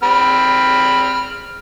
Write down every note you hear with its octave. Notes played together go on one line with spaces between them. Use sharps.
C4 B5 F6